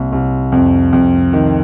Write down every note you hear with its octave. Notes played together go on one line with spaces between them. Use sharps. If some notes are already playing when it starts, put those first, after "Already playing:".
Already playing: C2 A#2
C2
F2
F2
D#3